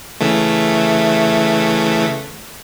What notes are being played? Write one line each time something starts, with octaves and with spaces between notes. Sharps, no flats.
C#3 E3 A3